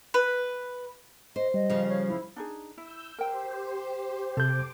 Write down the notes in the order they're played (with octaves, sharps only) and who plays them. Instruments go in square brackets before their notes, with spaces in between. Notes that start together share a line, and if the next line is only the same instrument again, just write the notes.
[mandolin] B4
[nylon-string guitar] C5 [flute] D#5
[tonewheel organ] G3 [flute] D#5
[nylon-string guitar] C#3 F3
[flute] C#5
E4
[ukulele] D4 D#4 G#4
[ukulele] E4 [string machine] E6 G6
[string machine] G4 C5 [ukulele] A#4 G5
[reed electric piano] C3 G6 [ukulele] A4 [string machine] D6